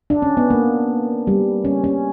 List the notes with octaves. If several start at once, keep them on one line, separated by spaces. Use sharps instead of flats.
D4
C#4
B3
A#3
G3
C#4
C#4